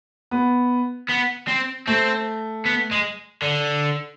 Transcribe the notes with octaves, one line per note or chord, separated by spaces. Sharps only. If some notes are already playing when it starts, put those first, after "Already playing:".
B3
B3
C4
A3 C4
B3
G#3
D3